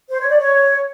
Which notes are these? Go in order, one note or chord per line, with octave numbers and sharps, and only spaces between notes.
C5
C#5
D5
C#5